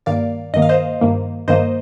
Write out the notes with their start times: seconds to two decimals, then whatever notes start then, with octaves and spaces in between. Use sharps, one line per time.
0.06 G2 D#3 A#3 D5 F5
0.54 G2 D#3 A#3 D#5
0.62 F5
0.69 C5 D#5
1.01 G2 D#3 A#3
1.48 G2 D#3 A#3 C5 D#5